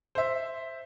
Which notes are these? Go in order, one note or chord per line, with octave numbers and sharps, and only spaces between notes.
C5 E5